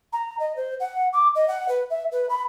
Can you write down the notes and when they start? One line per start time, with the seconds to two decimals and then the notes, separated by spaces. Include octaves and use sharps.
0.13 A#5
0.39 D#5
0.56 C5
0.80 F#5
1.13 D6
1.35 D#5
1.48 F#5
1.69 B4
1.90 E5
2.12 B4
2.29 B5